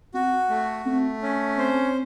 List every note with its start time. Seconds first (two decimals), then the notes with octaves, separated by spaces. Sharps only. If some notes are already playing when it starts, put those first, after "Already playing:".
0.14 C4 F#4
0.50 A3
0.85 A3 C4
1.22 C#4
1.58 C4 C5